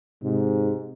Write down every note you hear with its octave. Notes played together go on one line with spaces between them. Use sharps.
G#2 C3